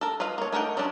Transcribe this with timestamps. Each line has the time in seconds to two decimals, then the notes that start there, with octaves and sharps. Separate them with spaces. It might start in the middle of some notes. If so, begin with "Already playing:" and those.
0.01 A4 A#4
0.20 F4 B4 D#5 F5
0.38 A#3 C#5
0.52 A3 D#4 A#4 F#5 G5
0.77 F#3 G#3 C#4 D4